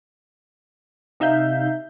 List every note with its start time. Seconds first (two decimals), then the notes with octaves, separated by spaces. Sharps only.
1.20 C3 D#4 E5 F5 G6